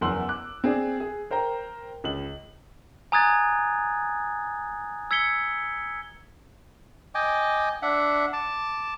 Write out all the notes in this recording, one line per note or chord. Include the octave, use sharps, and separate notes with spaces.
F#1 E2 F#5 C6 E6 F#7
D6 F#6
C4 G#4 D5
G#4
A#4 C5 G5 A#5
C#2 F#7
G#5 A#5 D#6 F#6 G#6 A6
E6 G#6 B6 C#7 G7
D#5 G5 G#5 D6
D4 E5 F#5
A5 D6